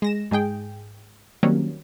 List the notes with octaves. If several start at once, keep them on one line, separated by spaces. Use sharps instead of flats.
G#3 A#6 E7
G#2 G#3 G#4 G5
D#3 F#3 G3 A#3 C4 C#4